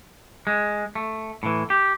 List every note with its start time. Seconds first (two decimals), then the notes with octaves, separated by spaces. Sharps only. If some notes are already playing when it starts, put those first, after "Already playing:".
0.47 G#3
0.95 A3
1.43 A2 E3
1.70 G4